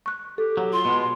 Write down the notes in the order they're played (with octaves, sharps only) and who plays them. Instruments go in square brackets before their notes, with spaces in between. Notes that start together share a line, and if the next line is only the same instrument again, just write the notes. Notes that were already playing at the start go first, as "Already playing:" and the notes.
[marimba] C#6 F#6
[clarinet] G4 [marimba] A4
[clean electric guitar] F#3
[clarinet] F4 [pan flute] C6
[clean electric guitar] B2 G#3